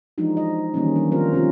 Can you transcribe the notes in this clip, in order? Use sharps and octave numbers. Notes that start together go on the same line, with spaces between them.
E3 F3 G#3 D4 D#4 F#4
D#5
D#3 E3 G3 A#3 C#4
F#3 G3 D4
D#3 F3 C4 F4 A#4 C5
C3 G3 C#4 D4 F4